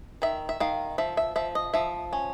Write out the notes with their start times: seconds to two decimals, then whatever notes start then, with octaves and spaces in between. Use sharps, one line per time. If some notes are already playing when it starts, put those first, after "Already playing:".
0.22 D#3 E5
0.49 E5
0.60 D#3 F5
0.98 F3 E5
1.17 E5
1.36 F3 E5
1.55 D#5
1.74 F3 E5
2.13 C#4